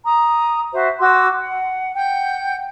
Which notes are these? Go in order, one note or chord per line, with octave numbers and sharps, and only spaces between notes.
A#5 D#6
F#4 C5 E5
F#4 C6 D6 E6
F#5
F#5 G5 G6